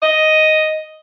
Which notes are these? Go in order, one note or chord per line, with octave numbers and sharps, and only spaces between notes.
D#5